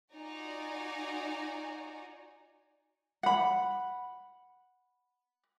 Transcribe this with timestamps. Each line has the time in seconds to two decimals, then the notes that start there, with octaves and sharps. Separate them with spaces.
0.13 D#4 F4 F#4 D5 G#5 A#5
3.23 F#5 B5